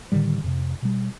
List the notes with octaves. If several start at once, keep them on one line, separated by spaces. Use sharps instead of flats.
A2 D3 D#3 G3
F2 C3
B2 G3